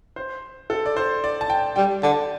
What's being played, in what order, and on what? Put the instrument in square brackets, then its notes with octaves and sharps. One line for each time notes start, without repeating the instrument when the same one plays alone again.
[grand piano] C5
A4
D5
C5
D5
A5
G5
[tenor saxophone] G3 [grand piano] G5
[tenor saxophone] D3 [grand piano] A5